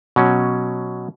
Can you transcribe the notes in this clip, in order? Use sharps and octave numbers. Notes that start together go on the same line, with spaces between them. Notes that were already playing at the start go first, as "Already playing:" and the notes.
B2 F#3 C#4